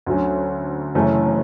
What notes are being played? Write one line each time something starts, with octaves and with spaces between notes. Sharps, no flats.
D2 D3 F#3 C#4
F#1 F#2 E3 A3 C#4